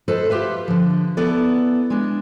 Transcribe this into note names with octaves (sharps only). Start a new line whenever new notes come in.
A4 B4 C5 D#5
F4 G4 B4 E5
D3 F3
B3 E4 A4 D5
G#3 D4